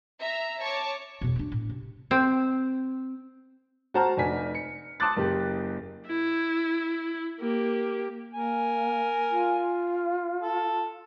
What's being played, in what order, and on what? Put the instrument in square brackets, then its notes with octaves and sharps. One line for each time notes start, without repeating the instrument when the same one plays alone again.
[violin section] E5 A#5
C#5 A5 C#6 D6
[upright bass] E2 B2
C#4 D4
A2
C3
[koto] C4
[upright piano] F#4 C5 A5 A#5 F6
F1 D4 G#5 B6
C#7
A5 C6 D6 D#6 F#6 A6
F#1 G4
[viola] E4
A#3 G4
[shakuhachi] A#3 [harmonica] A#4 G#5
[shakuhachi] F4
[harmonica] A4